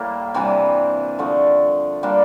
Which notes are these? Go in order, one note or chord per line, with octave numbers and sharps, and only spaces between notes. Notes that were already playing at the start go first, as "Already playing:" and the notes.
Already playing: A2 G3 A#3
C3 E3 G3 D4
D3 F3 A3
D3 G3 A#3 D4